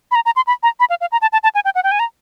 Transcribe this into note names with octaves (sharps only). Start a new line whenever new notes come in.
B5
A#5
A#5
C6
B5
A#5
B5
F5
F5
A#5
A5
A5
A5
G#5
G5
F#5
G5
G#5
A#5